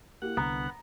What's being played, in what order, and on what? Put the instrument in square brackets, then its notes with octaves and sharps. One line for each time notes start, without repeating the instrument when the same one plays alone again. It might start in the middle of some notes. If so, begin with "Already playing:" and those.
[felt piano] A#3 E4 G4 [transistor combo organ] F#5
[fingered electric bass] C2 D3 [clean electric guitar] B3 [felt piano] A#5